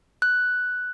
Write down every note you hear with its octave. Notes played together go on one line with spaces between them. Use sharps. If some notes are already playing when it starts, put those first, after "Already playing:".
F#6